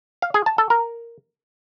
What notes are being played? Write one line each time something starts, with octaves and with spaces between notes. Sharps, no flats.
F5
G#4
A5
A4
A#4